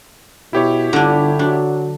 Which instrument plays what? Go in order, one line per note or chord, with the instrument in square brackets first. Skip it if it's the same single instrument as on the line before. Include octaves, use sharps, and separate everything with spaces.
[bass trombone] B2 [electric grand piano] E4 G4 C#5
[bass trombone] G1 [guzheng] D3 D4
[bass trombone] F#3 [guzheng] D4